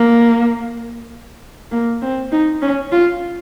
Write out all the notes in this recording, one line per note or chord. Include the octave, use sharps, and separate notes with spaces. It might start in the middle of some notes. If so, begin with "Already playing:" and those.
Already playing: A#3
A#3
C4
D#4
C#4
F4